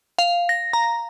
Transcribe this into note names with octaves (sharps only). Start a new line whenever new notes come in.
F5
A#6
A#5